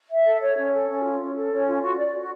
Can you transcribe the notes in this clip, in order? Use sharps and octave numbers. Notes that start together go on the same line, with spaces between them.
E5
A4
C#5
C#4
A4
C#4
F4
C#4
A4
C#4
F4
F#4
D5
F#4